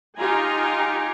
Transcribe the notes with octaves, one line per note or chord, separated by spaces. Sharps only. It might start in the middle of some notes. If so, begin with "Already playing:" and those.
D#4 F4 G4 G#5 A#5